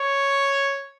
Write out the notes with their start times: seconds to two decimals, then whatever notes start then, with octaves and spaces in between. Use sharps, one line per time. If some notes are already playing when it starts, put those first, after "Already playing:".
Already playing: C#5